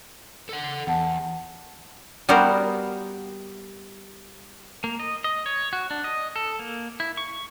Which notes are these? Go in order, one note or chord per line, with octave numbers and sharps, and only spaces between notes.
A4 F#5
E2 F#5 A5
G3 B3 F#4 A#4 C5
A#3
D#5
D#5
C#5
F#4
D4
D#5
A4
A#3
E4
C#6